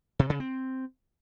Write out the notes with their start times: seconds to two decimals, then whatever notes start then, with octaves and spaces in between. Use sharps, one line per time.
0.19 C3
0.30 C#3
0.40 C4